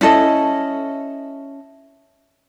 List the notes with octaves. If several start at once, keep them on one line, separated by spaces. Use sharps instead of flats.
C#4 E4 A4 D#5